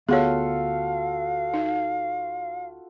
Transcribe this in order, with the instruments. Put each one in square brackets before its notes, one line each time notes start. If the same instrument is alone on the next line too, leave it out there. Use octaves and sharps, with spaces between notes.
[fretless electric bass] D2 B3 [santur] F4 F#4 A4 [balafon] G#4 C#5 [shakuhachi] F5
[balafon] D#4